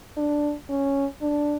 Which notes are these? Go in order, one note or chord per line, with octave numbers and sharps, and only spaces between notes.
D4
C#4
D4